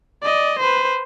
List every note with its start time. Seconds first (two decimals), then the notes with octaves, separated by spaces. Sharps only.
0.22 D5 D#5
0.59 B4 C5